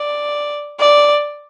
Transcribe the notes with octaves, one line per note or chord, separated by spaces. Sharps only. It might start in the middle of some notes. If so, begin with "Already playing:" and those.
Already playing: D5
D5